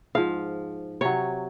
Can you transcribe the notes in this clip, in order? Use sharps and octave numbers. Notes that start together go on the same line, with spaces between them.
G#2 F3 F5
C3 F#3 C#5